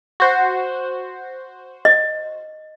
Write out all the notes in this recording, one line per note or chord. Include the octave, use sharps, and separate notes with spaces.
F#4 C5
D#5